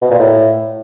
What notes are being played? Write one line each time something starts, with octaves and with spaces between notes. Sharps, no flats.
B2
A#2
A2